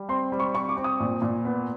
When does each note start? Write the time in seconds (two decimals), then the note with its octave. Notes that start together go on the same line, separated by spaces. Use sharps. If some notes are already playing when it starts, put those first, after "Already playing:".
Already playing: G3
0.09 C4 C6
0.32 G3
0.40 C#6
0.55 C4 C#6
0.69 D6
0.77 C4
0.84 D#6
1.00 A#2
1.22 A#2
1.45 B3